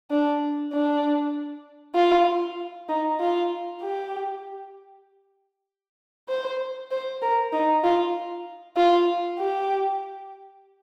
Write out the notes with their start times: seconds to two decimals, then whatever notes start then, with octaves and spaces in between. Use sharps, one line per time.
0.10 D4
0.72 D4
1.95 F4
2.89 D#4
3.20 F4
3.81 G4
6.29 C5
6.91 C5
7.22 A#4
7.53 D#4
7.84 F4
8.77 F4
9.39 G4